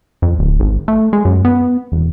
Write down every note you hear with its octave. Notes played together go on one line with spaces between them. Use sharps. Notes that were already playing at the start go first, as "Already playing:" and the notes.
F2
D1
G#1
A3
G#3
F#2
B3
E1